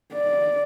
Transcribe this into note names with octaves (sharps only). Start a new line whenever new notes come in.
D5